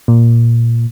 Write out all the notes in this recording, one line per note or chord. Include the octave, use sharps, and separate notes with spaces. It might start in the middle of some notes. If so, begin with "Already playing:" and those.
A#2